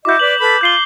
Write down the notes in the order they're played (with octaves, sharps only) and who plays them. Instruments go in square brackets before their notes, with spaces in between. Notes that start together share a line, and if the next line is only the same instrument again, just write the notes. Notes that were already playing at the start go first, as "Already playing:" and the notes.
[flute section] E4 F#4 D#5 [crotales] D6 G6
[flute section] B4 D5 [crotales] F#7
[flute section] A4 B4 B5
[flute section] F4 [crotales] G6 C7 G7